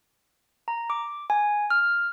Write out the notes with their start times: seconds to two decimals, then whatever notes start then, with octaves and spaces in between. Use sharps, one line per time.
0.68 A#5
0.90 D6
1.30 G#5
1.70 F6